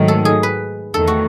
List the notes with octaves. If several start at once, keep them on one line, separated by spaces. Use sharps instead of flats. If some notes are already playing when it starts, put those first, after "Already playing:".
Already playing: G#2 D#3 F#3 A3
A4
G#4
B4
E2 D#3 A3 A4
F#4